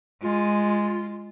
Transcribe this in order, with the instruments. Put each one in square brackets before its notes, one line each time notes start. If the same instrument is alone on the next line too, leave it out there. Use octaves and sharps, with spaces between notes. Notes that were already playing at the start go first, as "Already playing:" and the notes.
[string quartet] G#3 [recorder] F4